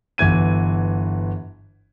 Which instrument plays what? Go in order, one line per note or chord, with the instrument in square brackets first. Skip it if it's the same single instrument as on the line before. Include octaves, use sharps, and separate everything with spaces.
[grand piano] G1 E3 G#6 D#7